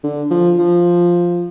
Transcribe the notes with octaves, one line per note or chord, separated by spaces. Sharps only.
D3
F3
F3